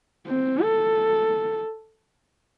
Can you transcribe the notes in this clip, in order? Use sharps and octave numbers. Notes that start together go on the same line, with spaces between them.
C4
A4